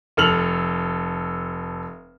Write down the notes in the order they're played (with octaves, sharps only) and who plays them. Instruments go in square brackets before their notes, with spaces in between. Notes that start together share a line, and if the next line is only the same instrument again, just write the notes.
[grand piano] F1 A4 F6 F7 F#7